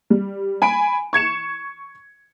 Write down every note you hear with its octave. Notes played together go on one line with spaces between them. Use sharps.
G3
G#5 B5 D7
C#6 G#6 C#7 E7